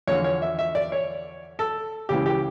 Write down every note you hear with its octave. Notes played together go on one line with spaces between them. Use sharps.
E2 D3 F3 C#5
C#5
E5
E5
D5
C#5
A4
C#2 C#3 E3 G4
G4